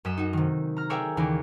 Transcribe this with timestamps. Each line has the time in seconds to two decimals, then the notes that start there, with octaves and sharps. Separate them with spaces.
0.05 F#2 D#5 B6 E7
0.17 D#4 F#4
0.33 C3 D#3
0.77 A#5 F6
0.90 G#4 A#4 C#5 D5 E5 G5
1.17 D#2 C#3 E3 A#4 D5